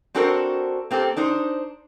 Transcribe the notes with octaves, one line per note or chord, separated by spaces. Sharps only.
C4 D4 F#4 A4 A#4 C5
A#3 C4 G4 A4
D4 D#4 C5